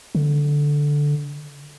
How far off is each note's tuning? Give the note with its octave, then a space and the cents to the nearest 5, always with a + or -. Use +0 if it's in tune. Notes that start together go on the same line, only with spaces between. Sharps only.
D3 -5